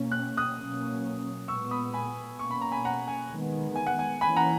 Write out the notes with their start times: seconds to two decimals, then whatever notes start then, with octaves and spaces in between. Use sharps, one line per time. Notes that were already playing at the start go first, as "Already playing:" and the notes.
Already playing: B2 A#3 C#4
0.12 F#6
0.37 D#6 F#6
0.57 B2 F#3 A#3 C#4
1.48 A#2 G#3 B3 C#6 E6
1.71 B5 D#6
1.93 G#5 B5
2.39 B2 A#3 C#4 C#6
2.51 B5
2.61 A#5
2.72 G#5 B5
2.85 F#5 A#5
3.08 G#5
3.30 D#3 G#3 B3
3.75 G#5
3.87 F#5
3.99 G#5
4.21 E3 A#3 C#4 G#5 B5
4.36 F#5 A#5